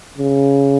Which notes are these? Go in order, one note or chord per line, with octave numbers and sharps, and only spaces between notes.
C#3